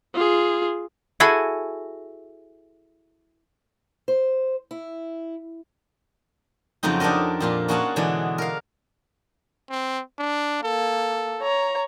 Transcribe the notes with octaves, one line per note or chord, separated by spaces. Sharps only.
F4 G#4
E4 F#4 G#4 A4 G#5
C5
E4
F2 C#3 F#3 C4 D#4
D4 G4 A4 A#4 D#5
F2 A#2 F4
A#3 C#4 F#4 G#4 F#5 A5
B2 D3 E3 G#3 D4
A#4 F5
C4
D4
A#3 A4
C#5 A#5